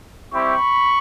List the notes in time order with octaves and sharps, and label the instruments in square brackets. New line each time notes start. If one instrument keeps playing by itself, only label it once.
[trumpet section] G3 C4 E4 G4 B5 C#6